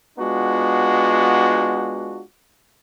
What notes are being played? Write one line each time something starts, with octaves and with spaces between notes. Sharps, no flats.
G#3 B3 D4 F4 F#4